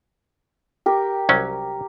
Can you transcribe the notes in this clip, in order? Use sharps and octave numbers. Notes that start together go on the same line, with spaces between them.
G4 A#4
C2 F#3 C#4